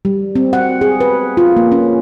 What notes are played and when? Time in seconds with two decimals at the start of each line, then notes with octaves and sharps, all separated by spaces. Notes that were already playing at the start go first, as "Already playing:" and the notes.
0.05 G3
0.36 C4
0.53 F#5
0.81 G#4
1.00 B4
1.37 F4
1.57 A#3
1.72 C#4